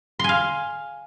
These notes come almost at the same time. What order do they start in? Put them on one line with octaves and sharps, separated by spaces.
C6 G#5 F5